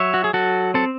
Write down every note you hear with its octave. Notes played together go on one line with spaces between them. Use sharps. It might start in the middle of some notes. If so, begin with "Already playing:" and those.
Already playing: F#3 C#5 E5
F#4
G#4
F#3 F#4 A4
C4 A4